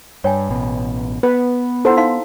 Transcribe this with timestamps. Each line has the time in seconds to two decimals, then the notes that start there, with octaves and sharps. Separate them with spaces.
0.24 G2 C#5 G5 G#5
0.49 A1 B2
1.23 B3 B4
1.85 E4 A4 C5 F#5 A#5
1.97 D#4 F5 C6